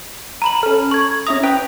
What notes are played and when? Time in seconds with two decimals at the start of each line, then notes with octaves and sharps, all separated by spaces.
0.42 A#5 B5 F#7
0.63 C#4 A4 F6
0.91 C#6 G#6
1.27 C#4 E4 A#5 D#6
1.43 B4 G5